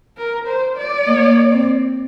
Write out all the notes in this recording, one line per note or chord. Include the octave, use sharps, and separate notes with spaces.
A#4
C5
D5
A#3
C4